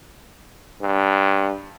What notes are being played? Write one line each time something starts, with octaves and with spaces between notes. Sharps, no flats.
G2